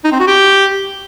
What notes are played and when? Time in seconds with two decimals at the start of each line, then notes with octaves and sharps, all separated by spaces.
0.04 D#4
0.12 C4
0.20 F#4
0.27 G4